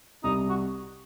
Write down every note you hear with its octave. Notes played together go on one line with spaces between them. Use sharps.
C2 D#4
F#4